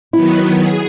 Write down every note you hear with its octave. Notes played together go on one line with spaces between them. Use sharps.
D#3 F#3 B3 E4
G#4